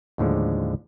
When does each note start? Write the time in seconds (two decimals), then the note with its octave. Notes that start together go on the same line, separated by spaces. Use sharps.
0.18 D#2 A2 D3 F3 G#3